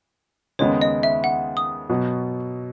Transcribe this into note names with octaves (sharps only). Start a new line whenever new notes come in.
D#2 C#3 G#3 B3 D#4 C#5
D#5
E5
F#5
D#6
B2 F#3 B3 F#4